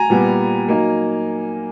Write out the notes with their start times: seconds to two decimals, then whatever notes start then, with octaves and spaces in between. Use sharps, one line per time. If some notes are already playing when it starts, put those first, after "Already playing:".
Already playing: G#5 A#5
0.10 A#2 G3 B3
0.68 F#3 A#3 D#4